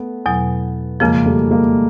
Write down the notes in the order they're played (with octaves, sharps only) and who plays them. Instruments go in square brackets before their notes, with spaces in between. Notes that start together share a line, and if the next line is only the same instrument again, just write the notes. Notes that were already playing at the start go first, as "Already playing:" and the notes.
Already playing: [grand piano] A3 B3
[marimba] E2 B2 F#3
[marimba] F2 C#3 F3 [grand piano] G#3 A#3
[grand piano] G3 A3
G#3 A#3